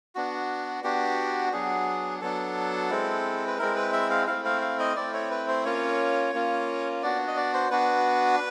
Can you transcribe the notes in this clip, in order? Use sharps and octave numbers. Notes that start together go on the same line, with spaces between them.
B3 D4 F#4
B3 D4 F#4 G4
F#3 B3 D4 G#4
F#3 B3 D4 A4
G#3 C4 E4
B4
G#3 C4 E4 A#4
B4
E5
F5
A3 C4 E4 F5
F5
F5
D#5
A3 C4 E4 D5
C#5
B4
C5
A#3 C#4 F4 C#5
A#3 C#4 F4
B3 D4 F#4 D5
D#5
D5
C5
B3 D4 F#4 B4